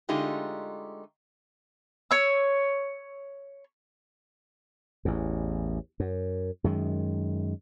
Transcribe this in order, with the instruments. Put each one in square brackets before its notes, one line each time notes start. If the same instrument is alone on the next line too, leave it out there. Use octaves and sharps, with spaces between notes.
[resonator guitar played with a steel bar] D3 G#3 A3 D#4 F4 G4
[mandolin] C#5 E6
[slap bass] A1 E2
F#2
F#2 D#3 G#3